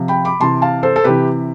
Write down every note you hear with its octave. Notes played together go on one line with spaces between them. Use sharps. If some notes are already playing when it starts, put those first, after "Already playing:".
Already playing: C3 F3
G5 B5
B5 D6
C3 E3 A5 C6
F5 A5
A4 C5
A4
C3 E3 G4 B4